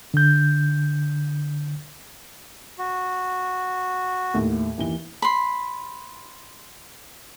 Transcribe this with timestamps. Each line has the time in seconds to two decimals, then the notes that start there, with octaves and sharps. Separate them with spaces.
0.14 D3 G6
2.79 F#4
4.34 D#2 A2
4.78 D#2 E3 G7
5.22 B5 C6